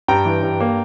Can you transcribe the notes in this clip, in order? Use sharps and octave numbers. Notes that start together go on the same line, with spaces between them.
G2 G5 A#5
E3
G2
A#3